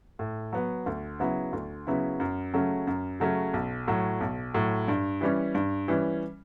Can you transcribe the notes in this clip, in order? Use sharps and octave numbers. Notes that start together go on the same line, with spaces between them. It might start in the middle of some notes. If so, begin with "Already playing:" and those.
A2
F#3 B3
D2
C#3 F#3 B3 E4
D2
C#3 F#3 B3 E4
F#2
C#3 F#3 A3 C#4
F#2
C#3 F#3 A3 C#4
B1
A2 F#3
B1
A2 F#3
G2
E3 G3 C#4
G2
E3 G3 C#4